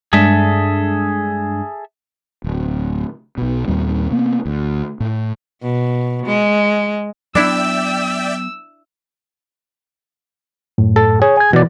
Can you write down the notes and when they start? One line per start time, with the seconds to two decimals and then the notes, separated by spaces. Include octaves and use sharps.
0.13 G2 G#3 D4 G#4 A4 E5
2.44 D1
3.38 B1 B2
3.67 D#2 A#2 G3 C4
4.11 C3 A#3 B3
4.46 D2
5.00 A2
5.62 B2
6.26 G#3
7.35 F#3 B3 D4 E4 D5 E5 G5 E6
10.78 F#2 A2
10.96 A4
11.22 G#4 C#5
11.37 G#5 G#6
11.53 B2 E3 D5